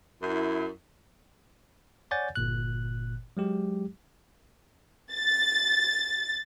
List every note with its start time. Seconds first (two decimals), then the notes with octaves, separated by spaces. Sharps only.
0.22 F#2 E4
2.11 C#5 D5 F#5 G#5 G6 A6
2.36 G1 A#2 F#6
3.37 F#3 G#3 G4
5.13 A6